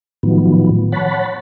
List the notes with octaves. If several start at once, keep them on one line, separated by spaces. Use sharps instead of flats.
A2 D#3 F3 F#3 B3
C#5 F#5 A5 B5